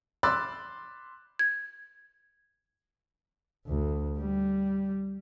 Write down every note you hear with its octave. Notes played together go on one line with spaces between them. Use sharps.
B5 C6 D6 E6 F#6 A6
G#6
D2
G3